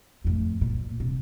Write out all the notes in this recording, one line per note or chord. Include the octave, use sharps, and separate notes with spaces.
F2 A2
A#2
C3